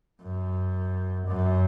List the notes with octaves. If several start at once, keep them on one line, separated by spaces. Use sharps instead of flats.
F#2
F#2